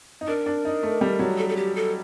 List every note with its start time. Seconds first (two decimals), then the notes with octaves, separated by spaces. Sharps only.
0.21 D#4
0.27 D4 A#4
0.46 D4
0.65 D#4
0.83 A3
1.01 G3
1.19 F#3
1.38 A4
1.49 A4
1.57 G4
1.76 A4